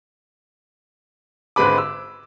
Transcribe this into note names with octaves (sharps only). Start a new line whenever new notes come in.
G#1 D3 G#3 B4 B5 D6
E6